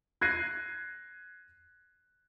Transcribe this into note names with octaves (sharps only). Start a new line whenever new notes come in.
F#6 G#6 A#6 C7 D#7